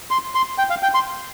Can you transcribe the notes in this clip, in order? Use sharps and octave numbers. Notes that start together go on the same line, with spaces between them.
C6
C6
G5
F5
G5
C6